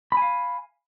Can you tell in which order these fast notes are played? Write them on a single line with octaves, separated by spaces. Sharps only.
B5 G#5 F5